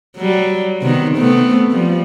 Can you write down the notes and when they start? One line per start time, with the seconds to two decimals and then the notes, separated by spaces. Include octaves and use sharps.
0.16 F#3 G3
0.82 C3 D#3 B3
1.17 A3 B3 C4
1.71 F3 G3